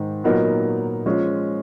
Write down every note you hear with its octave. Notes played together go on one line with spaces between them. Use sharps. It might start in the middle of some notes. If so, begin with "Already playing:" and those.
Already playing: G#2 D#3 G#3
A#2 F#3 B3 D#4 A#4
F3 G#3 C#4 F4